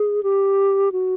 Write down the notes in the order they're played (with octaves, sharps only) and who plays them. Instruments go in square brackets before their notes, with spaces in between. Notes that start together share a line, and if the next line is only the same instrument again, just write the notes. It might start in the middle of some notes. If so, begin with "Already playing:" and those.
Already playing: [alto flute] G#4
G4
F#4